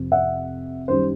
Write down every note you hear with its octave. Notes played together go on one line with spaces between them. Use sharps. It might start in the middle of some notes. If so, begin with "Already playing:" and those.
Already playing: F2 C3 F3
E5 F#5
F#2 D#3 G3 C5